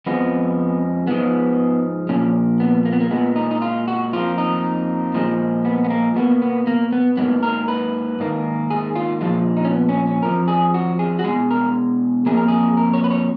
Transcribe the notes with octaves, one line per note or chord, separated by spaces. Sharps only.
F2 F3 G#3 B3
G#2 F3 G#3 B3
A#2 F3 A#3 C#4
B3
A#3
B3
A#3
A#2 G#3 B3
D#4
D#4
F4
F#4
F2 F3 A#3 F4
D#4
A#2 F3 G#3
B3
B3
A#3
B2 A#3 B3
B3
A#3
B3
G#2 F#3 A#3 B3
A#4
B4
G#2 D#3 A#3
G#4
F4
A#2 F3 G#3 F4
D#4
C#4
B3
C#4
C#4
F2 F3 A#4
G#4
F#4
G#4
F#4
B2 G#3 G#4
A#4
F2 C#3 F#3 A#3 G#4
A#4
G#4
A#4
C#5
B4
C#5